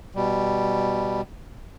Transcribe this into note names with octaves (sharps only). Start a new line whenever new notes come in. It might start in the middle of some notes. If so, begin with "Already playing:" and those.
B2 G3